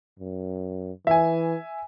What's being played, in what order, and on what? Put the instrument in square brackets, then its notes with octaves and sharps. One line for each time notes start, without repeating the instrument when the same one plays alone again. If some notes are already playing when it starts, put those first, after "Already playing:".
[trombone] F#2
[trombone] E3 [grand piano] E5 G#5